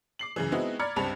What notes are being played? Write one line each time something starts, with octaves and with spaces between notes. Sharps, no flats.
D6 C7 F#7
F#2 C#3 E3
G#3 B3 C4 D#4 E4 F#4
D5 A#5 B5 F6 G#6 C#7
C#2 G2 C4 A5 B5 F7